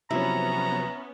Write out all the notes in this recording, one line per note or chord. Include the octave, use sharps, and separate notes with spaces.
C3 F3 F#3 B3 C#4 E4 A#5